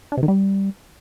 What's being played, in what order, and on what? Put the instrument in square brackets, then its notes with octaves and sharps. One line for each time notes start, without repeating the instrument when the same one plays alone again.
[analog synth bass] D4
C3
D#3
G3